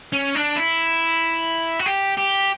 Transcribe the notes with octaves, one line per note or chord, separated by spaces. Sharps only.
C#4
D4
E4
F#4
G4
G4